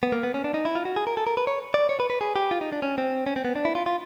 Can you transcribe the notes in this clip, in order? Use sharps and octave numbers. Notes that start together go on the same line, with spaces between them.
B3
A#3
B3
C#4
D4
D#4
E4
F4
F#4
G#4
A#4
A4
A#4
B4
C#5
D5
C#5
B4
B4
G#4
G4
F4
D#4
D4
C#4
C4
C#4
C4
B3
D4
E4
F4
F4